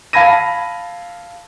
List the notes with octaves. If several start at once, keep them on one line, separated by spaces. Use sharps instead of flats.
F5 A5 B5 G#6 A#6 D#7